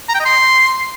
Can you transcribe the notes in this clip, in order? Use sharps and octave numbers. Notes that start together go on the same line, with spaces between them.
A#5
G5
D#5
C6